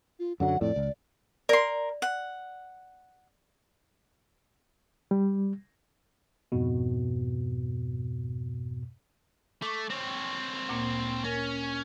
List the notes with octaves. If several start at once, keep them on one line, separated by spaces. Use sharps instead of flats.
F4
F#2 D3 F#3 F#5
F2 A2 D5
C#2
A#4 D5 C6
F#5
G3
F2 G#2 B2
A3 C#6 D6
C4 C#5
D2 A#2 A#3
C#4 A#4